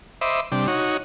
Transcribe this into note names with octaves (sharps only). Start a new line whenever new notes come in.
C5 D#5 E5 B5 D6
C3 G3 D4
D#4 F#4 C#5